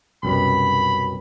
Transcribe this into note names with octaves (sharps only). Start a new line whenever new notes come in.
C2 F#2 B2 B5